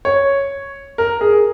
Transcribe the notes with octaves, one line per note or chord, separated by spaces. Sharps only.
C#5
A#4
G#4